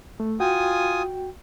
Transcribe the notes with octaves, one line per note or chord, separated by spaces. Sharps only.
A3
F4 F#4 G5 G#5 D#6